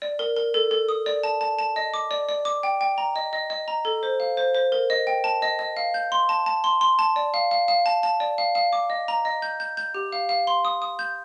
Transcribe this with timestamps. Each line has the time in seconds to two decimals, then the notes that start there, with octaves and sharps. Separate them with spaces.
0.02 D5
0.19 A#4
0.36 A#4
0.54 A4
0.71 A4
0.89 D#6
1.06 D5
1.23 A5
1.41 A5
1.59 A5
1.76 D#5
1.94 D6
2.11 D5
2.29 D5
2.45 D6
2.63 G5
2.81 G5
2.98 A#5
3.16 D#5
3.33 D#5
3.50 D#5
3.68 A#5
3.85 A4
4.03 C5
4.20 F5
4.37 C5
4.54 C5
4.72 A#4
4.90 D#5
5.07 G5
5.24 A5
5.42 D#5
5.59 D#5
5.77 F5
5.94 G6
6.12 C6
6.29 A5
6.46 A5
6.64 C6
6.81 C6
6.99 A5
7.16 D5
7.34 F5
7.51 F5
7.68 F5
7.86 A5
8.03 A5
8.20 D5
8.38 F5
8.55 F5
8.73 D6
8.90 D#5
9.08 A#5
9.25 D#5
9.42 G6
9.60 G6
9.77 G6
9.94 G4
10.12 F5
10.29 F5
10.47 C6
10.65 D#6
10.82 D#6
10.99 G6